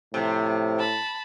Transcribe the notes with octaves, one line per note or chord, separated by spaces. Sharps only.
A2 C3 F3
A5 B5